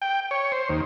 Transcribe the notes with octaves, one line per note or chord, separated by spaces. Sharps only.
G5
C#5
C5
D#2